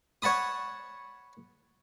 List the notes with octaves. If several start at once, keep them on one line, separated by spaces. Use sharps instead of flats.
C#5 F#5 A5 B5 D#6